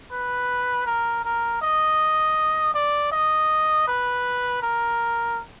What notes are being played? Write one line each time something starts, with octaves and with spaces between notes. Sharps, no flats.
B4
A#4
A#4
D#5
D5
D#5
B4
A#4